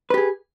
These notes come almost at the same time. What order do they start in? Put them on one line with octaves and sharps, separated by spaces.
B4 G4 G#4